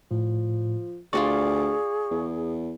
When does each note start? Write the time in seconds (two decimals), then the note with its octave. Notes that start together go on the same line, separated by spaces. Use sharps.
0.11 A2 F3
1.13 D2 F4 F#4 G#4 D5 C#6
2.11 E2